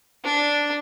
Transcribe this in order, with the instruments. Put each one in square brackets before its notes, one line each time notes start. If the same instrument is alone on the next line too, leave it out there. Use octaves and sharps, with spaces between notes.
[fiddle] D4